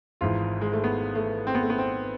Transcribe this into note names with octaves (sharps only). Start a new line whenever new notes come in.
G#1 G#2 E3 F4
G#3
A3
B3
A3
C4
B3
A3
B3
C4